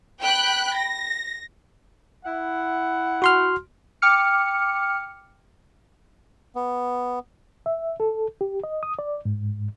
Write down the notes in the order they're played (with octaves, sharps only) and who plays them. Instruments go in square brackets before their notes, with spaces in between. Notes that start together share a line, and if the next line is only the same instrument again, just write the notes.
[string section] G5 B5 F#6
A#6
[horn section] E4 F#5
[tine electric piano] F#4 C6 F6
[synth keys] G5 D6 F6 C#7
[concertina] B3
[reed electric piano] E5
A4
G4
D#5
D#6
D5
G#2